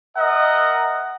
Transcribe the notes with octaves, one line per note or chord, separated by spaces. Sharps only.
A#4 D#5 E5 F#5